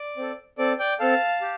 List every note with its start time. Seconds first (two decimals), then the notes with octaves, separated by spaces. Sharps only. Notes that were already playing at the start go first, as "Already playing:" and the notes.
Already playing: D5
0.17 C4 A4
0.58 C4 A4 D5
0.79 D5 G5
1.00 C4 A4 F5 A5
1.42 G4